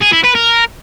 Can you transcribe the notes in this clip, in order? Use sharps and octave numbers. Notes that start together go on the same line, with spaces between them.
G#4
E4
B4
A#4